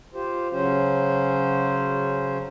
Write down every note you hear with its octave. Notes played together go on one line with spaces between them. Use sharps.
F4 G4 C5
C#3 F#3 C#4 C5